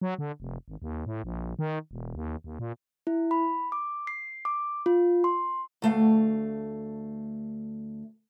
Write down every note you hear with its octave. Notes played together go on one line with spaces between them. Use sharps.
F#3
D3
F1
G#1
D#2
A2
A#1
D#3
E1
D#2
D#2
A#2
E4
B5
D6
C7
D6
F4
C6
D2 A3 F5